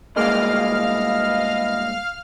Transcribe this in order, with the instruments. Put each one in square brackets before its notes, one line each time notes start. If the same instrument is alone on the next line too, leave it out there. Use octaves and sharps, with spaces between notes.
[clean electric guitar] G2 G#3 A#3 [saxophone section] B2 E4 D#5 [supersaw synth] F5 F6